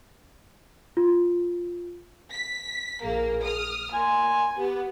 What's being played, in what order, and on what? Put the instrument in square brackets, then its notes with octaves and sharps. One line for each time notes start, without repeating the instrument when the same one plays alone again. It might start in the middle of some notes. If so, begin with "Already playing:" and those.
[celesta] F4
[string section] B6
[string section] A#1 A#3 [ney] G#4
[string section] D#6 F6
[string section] A#2 [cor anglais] G#5 [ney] C6
[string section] B3 [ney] G4